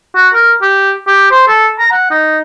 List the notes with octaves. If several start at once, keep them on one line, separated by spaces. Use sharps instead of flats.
F#4
A#4
G4
G4
C5
A4
A#5
F#5
D#4